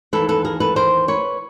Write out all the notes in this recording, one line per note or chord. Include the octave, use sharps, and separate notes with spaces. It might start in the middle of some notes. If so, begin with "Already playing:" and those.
D#2 C#3 E3 A4 B4
A4 B4
G#4 A#4
A4 B4
A#4 C5
B4 C#5